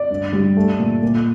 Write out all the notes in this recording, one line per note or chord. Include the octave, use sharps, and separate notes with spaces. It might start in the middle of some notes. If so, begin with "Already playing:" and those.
Already playing: D5
G2
G3
A3
A#2
A#2